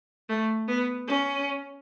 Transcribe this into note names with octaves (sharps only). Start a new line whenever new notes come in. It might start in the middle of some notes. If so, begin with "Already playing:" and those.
A3
B3
C#4